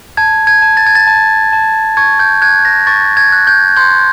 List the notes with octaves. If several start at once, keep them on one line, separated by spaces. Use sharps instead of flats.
A5 G#6
G#6
A5
A6
G#6
A6
A5
A5
C#6 G#6
G6
F#6 G#6
A#6
C#6 A6
G#6
F#6
G6
C6 G6